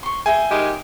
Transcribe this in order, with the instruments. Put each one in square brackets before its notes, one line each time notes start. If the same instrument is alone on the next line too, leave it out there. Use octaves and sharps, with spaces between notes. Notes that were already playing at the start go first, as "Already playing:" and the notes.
[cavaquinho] C6 C#6
[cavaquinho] G#4 E5 G5 [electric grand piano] G#5
[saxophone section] D#3 G#3 G4